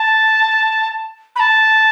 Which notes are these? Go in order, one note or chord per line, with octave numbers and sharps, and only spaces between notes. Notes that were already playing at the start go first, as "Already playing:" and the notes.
Already playing: A5
B5
A5